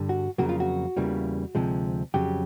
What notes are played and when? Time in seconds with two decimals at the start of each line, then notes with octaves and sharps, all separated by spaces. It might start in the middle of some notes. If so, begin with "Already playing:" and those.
Already playing: G2 D3 G3
0.09 F#4
0.38 F2 C#3 F#3 A#3 F#4
0.49 F4
0.60 F#4
0.96 E2 C#3 E3 G3 A#3
1.55 D2 C3 F3 G#3
2.14 F2 C#3 F#3 G4